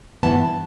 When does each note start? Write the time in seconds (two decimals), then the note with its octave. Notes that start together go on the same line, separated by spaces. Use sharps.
0.23 G2 E3 B3 A5